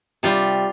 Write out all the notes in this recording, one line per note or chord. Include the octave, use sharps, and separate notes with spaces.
C3 G3 F4